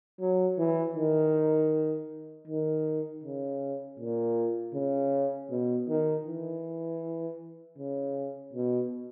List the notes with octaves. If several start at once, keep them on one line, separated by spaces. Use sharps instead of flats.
F#3
E3
D#3
D#3
C#3
A#2
C#3
B2
D#3
E3
C#3
B2